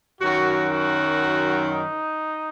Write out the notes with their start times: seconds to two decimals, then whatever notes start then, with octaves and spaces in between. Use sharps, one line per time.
0.21 F#2 D#3 F#3 F#4
0.71 F#4
1.73 D#4